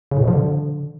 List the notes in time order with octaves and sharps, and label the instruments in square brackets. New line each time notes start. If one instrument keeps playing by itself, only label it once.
[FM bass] C#3
A2
B2
F3
D3